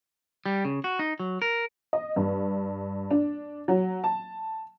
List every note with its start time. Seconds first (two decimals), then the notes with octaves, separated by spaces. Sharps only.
0.46 G3
0.65 C#3
0.84 F#4
0.99 D#4
1.20 F#3
1.42 A#4
1.93 D#5
2.16 G2
3.11 D4
3.68 F#3
4.04 A5